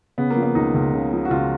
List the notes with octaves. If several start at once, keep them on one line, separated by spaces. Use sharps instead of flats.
C#3 B3
A#3
F3
B3
C#2 D#4
C#2
C#3
F3
F#4
C#2 F4